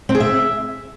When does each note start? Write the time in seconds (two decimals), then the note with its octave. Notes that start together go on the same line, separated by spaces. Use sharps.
0.09 C4
0.15 G#4
0.20 E5